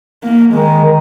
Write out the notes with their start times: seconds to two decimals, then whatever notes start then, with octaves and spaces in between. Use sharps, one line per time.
0.24 A#3
0.54 D#3 G#3
0.84 D#3